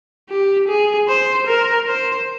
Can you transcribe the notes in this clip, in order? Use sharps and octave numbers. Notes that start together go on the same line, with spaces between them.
G4
G#4
C5
A#4
C5